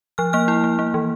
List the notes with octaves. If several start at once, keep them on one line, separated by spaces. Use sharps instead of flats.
F3 F6
A#3 F6
E4
A#3
A#3
E3